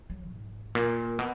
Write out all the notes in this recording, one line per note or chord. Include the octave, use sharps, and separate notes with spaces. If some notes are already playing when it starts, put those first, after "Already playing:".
F#3
G#2
A#2
B2